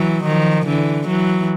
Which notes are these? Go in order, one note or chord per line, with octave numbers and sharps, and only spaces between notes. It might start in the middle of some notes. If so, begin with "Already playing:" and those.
Already playing: E3 F#3
D#3 F3
D3 E3
E3 F#3